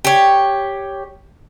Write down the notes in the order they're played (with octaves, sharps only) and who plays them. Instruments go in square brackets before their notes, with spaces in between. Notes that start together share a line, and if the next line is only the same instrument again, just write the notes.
[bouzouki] G4 C#5